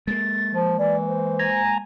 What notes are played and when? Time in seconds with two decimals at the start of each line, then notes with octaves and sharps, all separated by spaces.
0.07 G#3 A#3 A6
0.55 F3
0.79 E3 D5
1.07 C5
1.39 G#5 A#5